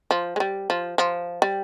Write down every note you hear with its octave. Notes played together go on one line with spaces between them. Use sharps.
F3
G#3
G3
F3
F3
G3